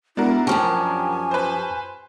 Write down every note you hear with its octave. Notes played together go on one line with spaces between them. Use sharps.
G#3 B3 D4 E4 F#4 A#4
F#2 F3 G4 G#5 A5 C#6 F6
B4 C5